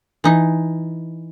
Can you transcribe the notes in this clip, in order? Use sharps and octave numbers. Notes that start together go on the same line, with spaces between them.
E3 D#4